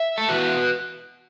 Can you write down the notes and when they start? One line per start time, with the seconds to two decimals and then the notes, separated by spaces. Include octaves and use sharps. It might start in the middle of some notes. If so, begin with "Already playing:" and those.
Already playing: E5
0.18 A4
0.28 E2 E3 B3 F#4 B4